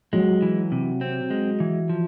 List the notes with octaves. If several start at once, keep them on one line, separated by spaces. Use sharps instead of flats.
F#3 G#3
E3
C3
C4
G#3
E3
F3